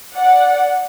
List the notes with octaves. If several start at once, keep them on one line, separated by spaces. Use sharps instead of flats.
D5 F#5